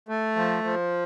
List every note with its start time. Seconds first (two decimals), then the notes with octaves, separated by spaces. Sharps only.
0.09 A3
0.36 F3
0.64 F3